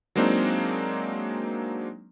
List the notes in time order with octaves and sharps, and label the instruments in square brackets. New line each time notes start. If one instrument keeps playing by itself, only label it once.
[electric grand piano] F#3 G#3 A#3 C4 D4 D#4